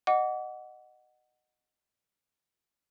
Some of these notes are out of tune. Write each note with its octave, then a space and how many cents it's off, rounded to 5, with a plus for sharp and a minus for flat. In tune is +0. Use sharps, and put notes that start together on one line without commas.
D#5 -15 F#5 +0 D6 -35